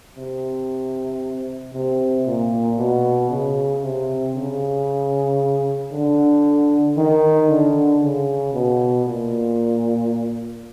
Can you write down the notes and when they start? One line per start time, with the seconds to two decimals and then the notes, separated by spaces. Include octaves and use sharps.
0.16 C3
1.73 C3
2.25 A#2
2.78 B2
3.30 C#3
3.83 C3
4.35 C#3
5.92 D3
6.97 D#3
7.50 D3
8.02 C#3
8.54 B2
9.06 A#2